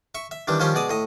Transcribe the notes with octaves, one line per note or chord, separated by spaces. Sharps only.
E5 C#6
E5
D#3 E3 G3 D4
D#3 F3 G3 C#4 G4 C5
B2 G#3 D5 D#6
A2 D#5